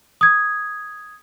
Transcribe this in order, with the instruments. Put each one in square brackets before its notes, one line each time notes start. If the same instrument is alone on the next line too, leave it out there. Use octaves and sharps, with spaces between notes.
[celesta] D#6 G#6